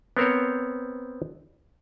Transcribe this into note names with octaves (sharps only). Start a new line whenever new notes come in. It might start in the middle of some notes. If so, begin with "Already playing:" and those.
B3 C4 A#4 C5 C#5